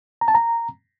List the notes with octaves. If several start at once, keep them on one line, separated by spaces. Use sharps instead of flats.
A#5
A5
A#5